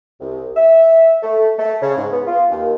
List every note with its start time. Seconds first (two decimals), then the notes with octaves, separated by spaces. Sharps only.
0.21 C2
0.56 E5
1.22 A3
1.59 A3
1.81 C#3
1.97 G#2
2.12 B3
2.27 F4
2.50 D#2